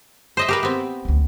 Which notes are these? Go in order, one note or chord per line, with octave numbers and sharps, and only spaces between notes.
C5 D#5 E5
G4 A#4 B4
B3 C4
D2 C#4